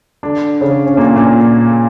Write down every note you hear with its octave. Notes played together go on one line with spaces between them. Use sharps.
D3 D4
C#3 C#4
C#4
A#2 A#3
A#2 A#3